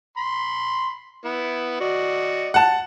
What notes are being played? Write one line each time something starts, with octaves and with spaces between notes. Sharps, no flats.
B5 C6
B3 E4
F#4 D5 D#5
F#5 A5